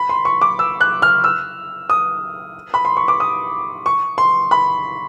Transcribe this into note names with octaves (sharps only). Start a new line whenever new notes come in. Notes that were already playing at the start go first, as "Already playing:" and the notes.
Already playing: B5
C6
C#6
D6
E6
F#6
F6
E6
D#6
B5
C6
C#6
D6
D#6
C#6
C6
B5